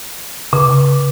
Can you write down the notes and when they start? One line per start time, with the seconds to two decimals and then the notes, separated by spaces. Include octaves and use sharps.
0.53 C#3